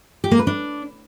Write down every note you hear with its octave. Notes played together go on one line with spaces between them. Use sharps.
G4
A#3
B4
D4